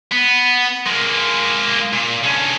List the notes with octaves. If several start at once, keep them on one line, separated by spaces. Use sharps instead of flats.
B3
G#3 A#3
A#2
D3 C#4